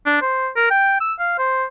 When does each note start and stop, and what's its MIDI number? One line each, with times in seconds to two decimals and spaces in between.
0.06 0.21 62
0.22 0.49 72
0.56 0.67 70
0.71 0.98 79
1.01 1.13 88
1.19 1.36 77
1.39 1.65 72